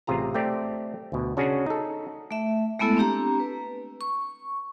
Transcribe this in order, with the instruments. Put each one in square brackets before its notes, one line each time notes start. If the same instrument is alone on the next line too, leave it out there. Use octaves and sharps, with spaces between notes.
[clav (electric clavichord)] A1 C3 F4 G#4 A#5
A3 C4 G4 D5
D2 B2
C#3 C#4 D4 F#4 G#4
D#4 A4
[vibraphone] A3 E5
G#3 A3 B3 E4 A4
C4 D4 G4 A#5
B4
C#6